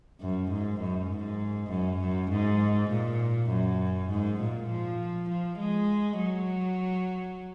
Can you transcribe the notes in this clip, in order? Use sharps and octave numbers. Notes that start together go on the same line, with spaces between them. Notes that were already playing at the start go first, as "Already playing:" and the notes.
F#2
G#2
F#2
G#2
F#2
F#2
G#2
A#2
F#2
G#2
A#2
F3
F3
G#3
F#3